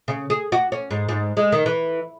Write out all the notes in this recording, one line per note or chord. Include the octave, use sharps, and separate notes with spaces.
C#3
G#4
F#4
C#4
G#2
G#2
G#3
D#3
E3